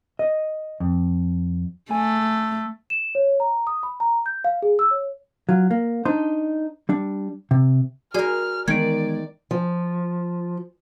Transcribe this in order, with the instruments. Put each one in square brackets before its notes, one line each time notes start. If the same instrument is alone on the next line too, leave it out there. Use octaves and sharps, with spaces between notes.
[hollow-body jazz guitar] D#5
F2
[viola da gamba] A3 [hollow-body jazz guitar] G#5
[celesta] E7
C#5
A#5
D#6
B5
A#5
G6
F5
G#4
E6
C#5
[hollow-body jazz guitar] F#3 F4
A#3
D4 D#4 C5
G3 D4
C3
[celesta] F#4 D5 [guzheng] G#4 A#4 [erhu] F6
[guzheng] D#3 [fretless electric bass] E3 G#3 B3 [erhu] D5 [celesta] G#6 D7
[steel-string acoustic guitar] F3